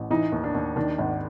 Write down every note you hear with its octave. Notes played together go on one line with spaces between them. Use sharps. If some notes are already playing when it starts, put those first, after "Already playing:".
Already playing: A1
E3 D#4
D#2
D4
D#2
D#3 D4
G#1